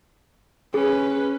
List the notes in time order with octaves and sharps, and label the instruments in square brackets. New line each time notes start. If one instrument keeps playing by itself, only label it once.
[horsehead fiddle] C#4 B4 [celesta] G#4